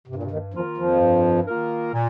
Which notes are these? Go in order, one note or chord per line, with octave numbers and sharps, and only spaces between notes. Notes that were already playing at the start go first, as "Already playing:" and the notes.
G2 C3
A#2
C3
D#2 D#3
F2 D#3 F3 A#3 F4 A#4
F2 F3
G2
D#3 A#3 F4 A#4
A#2